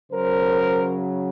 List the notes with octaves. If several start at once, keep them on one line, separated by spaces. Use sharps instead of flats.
C#3 F#3 A#4 C5